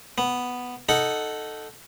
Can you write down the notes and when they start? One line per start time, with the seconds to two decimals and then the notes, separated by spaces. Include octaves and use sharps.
0.18 B3
0.89 D#4 A4 F#5